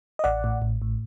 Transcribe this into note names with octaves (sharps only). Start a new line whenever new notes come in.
D#5
A1 D5 F#5
A2
A1
A2